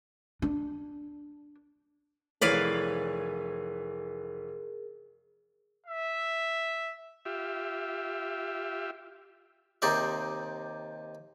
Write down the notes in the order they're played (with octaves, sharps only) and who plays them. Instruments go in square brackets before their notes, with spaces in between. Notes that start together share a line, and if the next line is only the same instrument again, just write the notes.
[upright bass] D4
[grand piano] F1 E3 C#5 [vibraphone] G#4 A#4 [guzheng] B4 D5 F5
[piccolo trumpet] E5
[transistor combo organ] F4 G4 E5
[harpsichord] D#2 C3 D#4 C5 D5 E5